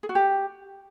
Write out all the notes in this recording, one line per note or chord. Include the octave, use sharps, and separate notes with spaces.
G#4
F#4
G4